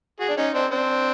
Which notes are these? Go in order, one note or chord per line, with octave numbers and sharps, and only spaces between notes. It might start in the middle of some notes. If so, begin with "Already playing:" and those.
F#4 G#4
D4
C#4 D#4
C4 D4
C4 D4